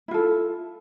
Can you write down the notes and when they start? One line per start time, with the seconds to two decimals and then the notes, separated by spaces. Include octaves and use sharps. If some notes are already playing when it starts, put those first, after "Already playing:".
0.08 E4
0.11 F4
0.14 A4